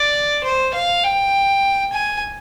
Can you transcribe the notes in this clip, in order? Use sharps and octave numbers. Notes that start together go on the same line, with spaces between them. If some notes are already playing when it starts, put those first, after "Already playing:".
Already playing: D5
C5
F5
G5
G#5